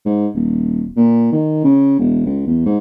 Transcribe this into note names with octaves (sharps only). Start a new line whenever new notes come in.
G#2
D#1
A#2
D#3
C#3
E1
C#2
E2
G#2